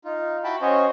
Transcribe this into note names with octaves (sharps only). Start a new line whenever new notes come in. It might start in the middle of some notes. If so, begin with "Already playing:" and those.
D#4 F4
E4 F#4 G5 A5 B5
C#4 F#4 C5 C#5 D#5